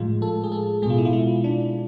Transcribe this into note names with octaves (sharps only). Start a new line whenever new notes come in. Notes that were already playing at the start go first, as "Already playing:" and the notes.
Already playing: A2 F3 G#3 F4
A4
G#4
A4
B2 G#3 F4 G#4
E4
F4
E4
D4